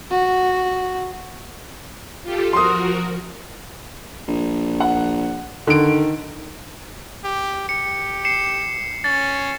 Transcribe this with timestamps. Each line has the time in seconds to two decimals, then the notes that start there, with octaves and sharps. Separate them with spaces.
0.11 F#4
2.24 F4 G4 A4
2.53 F3 F#4 A#4 C6 D#6
4.28 A#1
4.80 F#5
5.67 D3 D#3 D7
7.24 G4
7.69 G4 C#7
8.25 C7 C#7 E7
9.04 C#4 A6